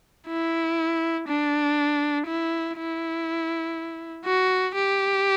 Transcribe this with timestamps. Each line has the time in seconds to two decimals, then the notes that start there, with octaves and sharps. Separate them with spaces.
0.28 E4
1.28 D4
2.27 E4
2.77 E4
4.25 F#4
4.75 G4